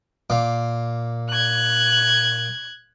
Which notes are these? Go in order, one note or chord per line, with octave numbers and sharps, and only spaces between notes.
A#2 F5 D6
F#6 G#6